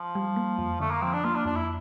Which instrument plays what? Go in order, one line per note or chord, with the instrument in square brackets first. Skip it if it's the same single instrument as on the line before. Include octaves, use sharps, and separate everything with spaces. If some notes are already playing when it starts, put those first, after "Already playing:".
Already playing: [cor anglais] F3
[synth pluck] G3
A#3
F2
[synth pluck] D3 [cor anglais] A3
[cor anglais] A#3
[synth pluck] F3 [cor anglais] C4
[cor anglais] D4
[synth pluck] A#3 [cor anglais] F4
[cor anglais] D4
[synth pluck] F2 [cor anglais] D4
[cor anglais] E4